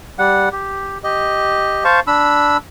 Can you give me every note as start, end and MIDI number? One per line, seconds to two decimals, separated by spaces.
0.19 0.49 55
0.19 0.49 78
0.52 0.98 67
1.04 1.84 67
1.04 1.84 75
1.84 2.00 72
1.84 2.00 77
1.84 2.00 81
1.84 2.00 85
2.07 2.57 62
2.07 2.57 83
2.07 2.57 88